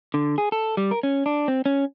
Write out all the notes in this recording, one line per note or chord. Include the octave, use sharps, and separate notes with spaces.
D3
G#4
A4
G3
A#4
C#4
D4
C4
C#4